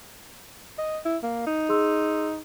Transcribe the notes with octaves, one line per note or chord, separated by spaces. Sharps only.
D#5
E4
A#3
D#4
G#4 C6 E6